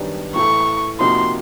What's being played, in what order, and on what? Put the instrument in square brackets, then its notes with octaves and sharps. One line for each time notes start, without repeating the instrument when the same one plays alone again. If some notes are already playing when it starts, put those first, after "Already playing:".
Already playing: [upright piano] F#2 D#3 G3 B3 D4
[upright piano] A2 E3 A3 [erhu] C#6
[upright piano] C3 F3 A#3 D#4 F#4 [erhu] C6